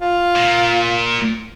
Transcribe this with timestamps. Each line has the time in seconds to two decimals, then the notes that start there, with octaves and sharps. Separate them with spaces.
0.01 F4
0.36 A#2